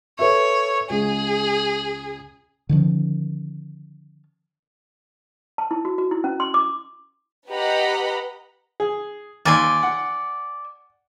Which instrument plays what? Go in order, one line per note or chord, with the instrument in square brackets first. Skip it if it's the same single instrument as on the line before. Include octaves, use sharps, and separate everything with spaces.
[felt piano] A4 B4 E5 [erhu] C#5
[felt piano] C#2 [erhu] G#4
[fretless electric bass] D3 D#3 F3 C#4
[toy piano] A5
E4
F#4
F#4
E4
C#4
C6
D6
[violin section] G4 B4 D#5 F#5 A#5 B5
[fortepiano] G#4
[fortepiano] D#2 [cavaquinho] D5 G#5 C6
[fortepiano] F#5